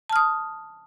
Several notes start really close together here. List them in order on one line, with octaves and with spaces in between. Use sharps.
A5 F6 D#6